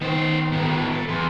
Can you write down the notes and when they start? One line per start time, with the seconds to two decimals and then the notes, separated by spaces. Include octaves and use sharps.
0.02 D#3 B3 C5
0.52 G#2 B3
0.92 E4 A4
1.09 E2 B3 C6